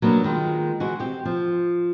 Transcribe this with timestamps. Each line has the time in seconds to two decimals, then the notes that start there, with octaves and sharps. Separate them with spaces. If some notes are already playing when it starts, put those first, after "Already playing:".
0.02 F#3 A#3 B3 D4
0.24 D#3 G#3 F4
0.80 E3 G#3 F#4
1.00 C4 G4
1.25 F3